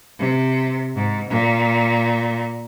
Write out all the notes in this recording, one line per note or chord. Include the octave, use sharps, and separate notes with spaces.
C3
G#2
A#2